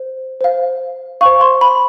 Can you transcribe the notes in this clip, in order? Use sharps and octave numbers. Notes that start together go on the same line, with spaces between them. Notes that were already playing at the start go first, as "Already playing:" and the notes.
Already playing: C5
C5 F5
C5 F5 C#6
C6
B5